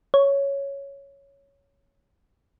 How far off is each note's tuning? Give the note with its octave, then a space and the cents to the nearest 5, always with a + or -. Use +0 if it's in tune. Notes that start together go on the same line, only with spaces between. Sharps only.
C#5 +5